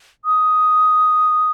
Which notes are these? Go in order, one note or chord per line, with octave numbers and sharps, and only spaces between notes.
D#6